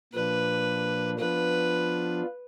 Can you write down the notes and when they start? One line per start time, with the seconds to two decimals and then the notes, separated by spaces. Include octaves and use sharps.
0.13 A#2 F3 A#3 D4 B4
1.19 F3 B3 D4 F4 B4